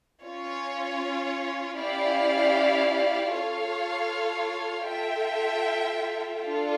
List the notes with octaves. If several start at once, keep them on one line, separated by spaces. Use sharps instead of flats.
C#4 F4 C#5
C#4 E4 G4 D5 F5
F4 A4 C#5 F5
F4 A4 E5 G5
D4 F4 A4